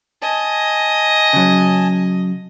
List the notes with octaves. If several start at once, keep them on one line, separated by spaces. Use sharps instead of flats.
D#5 G#5 A5
C#3 F#3